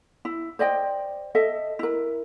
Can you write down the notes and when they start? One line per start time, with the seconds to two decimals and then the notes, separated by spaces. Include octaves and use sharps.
0.25 E4
0.59 C5 D5 D#5 G5
1.35 A4 D#5 E5
1.79 E4 A#4